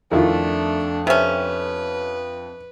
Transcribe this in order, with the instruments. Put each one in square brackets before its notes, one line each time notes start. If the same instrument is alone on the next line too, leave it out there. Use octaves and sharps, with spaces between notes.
[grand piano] F2 [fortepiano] D#3 E4 F4 [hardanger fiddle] A3 D4
[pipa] C3 C#4 [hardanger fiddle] B4 [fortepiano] E5